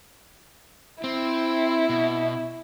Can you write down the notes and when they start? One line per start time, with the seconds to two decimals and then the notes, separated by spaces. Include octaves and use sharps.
1.04 C4 E4
1.89 B2